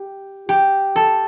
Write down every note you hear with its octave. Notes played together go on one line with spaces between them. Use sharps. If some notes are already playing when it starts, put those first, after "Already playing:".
Already playing: G4
G4
A4